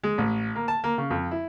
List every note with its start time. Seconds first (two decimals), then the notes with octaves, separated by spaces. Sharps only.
0.03 G#3
0.18 A1
0.55 A#3
0.68 A5
0.84 A#3
0.98 C#3
1.10 F2
1.31 E4